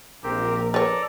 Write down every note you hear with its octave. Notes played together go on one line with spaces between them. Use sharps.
A#1 C4 G4 A#4
A4 B4 C#5 D5 A#5